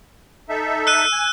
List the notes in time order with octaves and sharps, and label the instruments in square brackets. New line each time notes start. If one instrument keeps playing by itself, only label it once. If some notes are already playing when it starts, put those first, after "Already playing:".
[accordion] D#4 A4 E5
[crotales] E6 F#6 D#7
[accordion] G#5